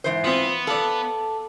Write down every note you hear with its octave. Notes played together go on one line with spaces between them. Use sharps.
G#2 E3 C5
B3 C4 F4
A4 D5 F5